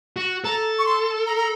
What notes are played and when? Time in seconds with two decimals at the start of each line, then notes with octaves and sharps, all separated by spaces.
0.17 F#4
0.44 A4 A#5
0.78 C#6
0.86 C6
1.27 A#5
1.37 A#5